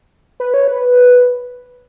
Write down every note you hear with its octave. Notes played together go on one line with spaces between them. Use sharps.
B4
C#5
B4